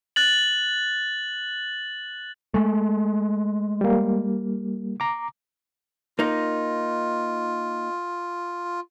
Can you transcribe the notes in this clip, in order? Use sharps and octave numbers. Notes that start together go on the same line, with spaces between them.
F#6 A6 F#7
G#3 A3
G3 A#3
A#5 D6
A#3 D#4 F4